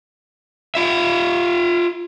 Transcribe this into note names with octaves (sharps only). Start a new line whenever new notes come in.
F4 E5